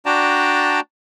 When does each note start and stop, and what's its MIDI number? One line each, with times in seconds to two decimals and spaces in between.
0.06 0.80 62
0.06 0.80 66
0.06 0.80 74
0.06 0.80 79
0.06 0.80 81
0.06 0.80 82